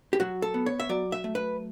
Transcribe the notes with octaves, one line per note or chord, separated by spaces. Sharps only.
G4
F#3 F#4
A4
B3
C#5
E5
F#3 D5
E5
A3
B4